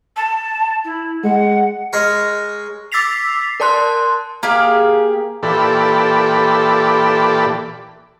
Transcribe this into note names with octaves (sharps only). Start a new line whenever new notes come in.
A5
E4
G#3 F#5
G#3 A#4 C#5
D6 E6 A6 B6 C7 F7
A#4 D5 A5 C6 F#6
A#3 G4 G#4 F5
A#2 E3 G4 A4 D5 B5